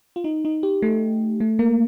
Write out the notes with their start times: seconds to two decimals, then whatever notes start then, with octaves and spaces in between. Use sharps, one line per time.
0.16 F4
0.24 D#4
0.45 D#4
0.63 G4
0.82 A3
1.40 A3
1.59 A#3